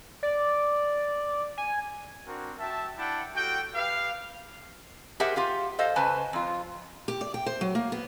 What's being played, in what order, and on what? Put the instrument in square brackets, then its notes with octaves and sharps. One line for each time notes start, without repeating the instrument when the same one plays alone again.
[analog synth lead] D5
G#5
[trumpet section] C4 D4 F#4 A#4
F#4 E5 G5 A5
D4 E4 F#5 G5 A5
G3 F#4 A4 G5
G4 B4 F5
[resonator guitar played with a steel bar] G4 G#4 A#4 C5 E5 F#5
F4 G4 F5
A4 C5 D#5 F5
C#3 B4 C5 G#5 A5
F2 F4
[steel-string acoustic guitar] G4
D5
G5
C5
F#3
A#3
B3